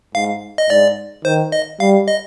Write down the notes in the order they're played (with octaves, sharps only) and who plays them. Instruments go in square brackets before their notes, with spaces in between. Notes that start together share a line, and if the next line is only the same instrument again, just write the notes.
[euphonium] G#2 [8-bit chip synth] F5
[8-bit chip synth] D#5
[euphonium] G#2 [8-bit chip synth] D5
[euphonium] D#3 [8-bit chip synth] C5
[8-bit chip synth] D#5
[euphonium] G3 [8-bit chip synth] F5
[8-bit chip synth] D#5